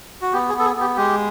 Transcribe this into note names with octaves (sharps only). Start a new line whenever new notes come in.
F#4
B3 G4
G#4
B3 A4
G#4
B3 G4
G#3 G4